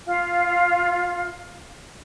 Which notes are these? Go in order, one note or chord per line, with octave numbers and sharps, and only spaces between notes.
F4 F5